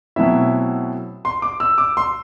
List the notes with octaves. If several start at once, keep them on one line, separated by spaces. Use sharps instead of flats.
B2 F#3 A3 C4 E4 E5
C6
D6
E6
D6
C6